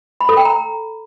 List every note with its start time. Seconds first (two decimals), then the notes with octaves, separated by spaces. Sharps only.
0.21 B5
0.29 A4
0.37 G5
0.45 A#5